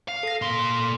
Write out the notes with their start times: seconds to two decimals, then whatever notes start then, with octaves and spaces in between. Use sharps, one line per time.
0.08 F5
0.23 A4 A#6
0.42 A#2 C6